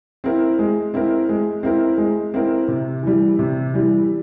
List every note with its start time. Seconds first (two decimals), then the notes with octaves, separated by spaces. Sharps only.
0.24 C4 E4 A#4
0.59 G#3
0.94 C4 E4 A#4
1.29 G#3
1.63 C4 E4 A#4
1.98 G#3
2.34 C4 E4 A#4
2.68 C3
3.03 E3 G3
3.39 C3
3.74 E3 G3